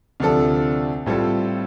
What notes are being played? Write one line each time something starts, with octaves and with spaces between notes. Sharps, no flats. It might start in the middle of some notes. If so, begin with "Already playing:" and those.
D2 C3 F3 D4 A4
A2 G3 C4 F4 A4